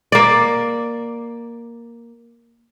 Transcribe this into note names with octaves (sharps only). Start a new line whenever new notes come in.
A#3 D5